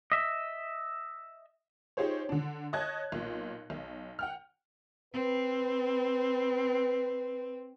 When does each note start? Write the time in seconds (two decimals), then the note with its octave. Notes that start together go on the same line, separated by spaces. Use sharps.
0.12 D#5 E5
1.97 D#4 F4 G4 G#4 C5 C#5
2.29 D3 D4
2.73 C#5 D#5 A5 F#6 G#6
3.12 B1 A#2
3.70 B1
4.19 F#5 G5 F6
5.13 C4 B4